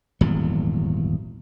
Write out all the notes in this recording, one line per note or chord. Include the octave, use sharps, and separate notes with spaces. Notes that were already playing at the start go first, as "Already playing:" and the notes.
D#1 G#1 E2 F#3